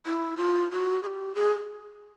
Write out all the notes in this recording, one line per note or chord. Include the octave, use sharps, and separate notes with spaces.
E4
F4
F#4
G#4
G4
G#4